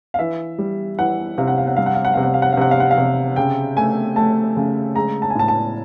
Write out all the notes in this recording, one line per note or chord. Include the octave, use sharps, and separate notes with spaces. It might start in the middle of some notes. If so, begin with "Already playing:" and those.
F5
E3 E5
G3
E3 F#5
C3 F5
F#5
F5
F#5
G3 F5
F#5
F5
F#5
C3 F5
F#5
F5
F#5
F5
C3 F#5
F5
F#5
F5
C3
C#3 G5
A3 G#5
A3 A5
C#3
G#3 A#5
A5
G#5
A2 A5
A5